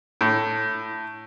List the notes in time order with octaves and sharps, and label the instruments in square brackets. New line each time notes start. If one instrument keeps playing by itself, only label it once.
[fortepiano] A2